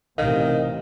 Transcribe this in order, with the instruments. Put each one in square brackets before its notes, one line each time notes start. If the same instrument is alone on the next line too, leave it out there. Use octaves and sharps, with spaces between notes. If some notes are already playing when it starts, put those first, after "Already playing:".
[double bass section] A1 C3 [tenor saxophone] D#3 [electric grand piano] D#5 F5